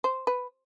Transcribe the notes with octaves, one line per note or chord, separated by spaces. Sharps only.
C5
B4